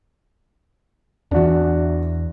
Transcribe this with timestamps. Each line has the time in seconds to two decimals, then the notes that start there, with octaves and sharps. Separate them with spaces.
1.31 E2 E3 D4 F#4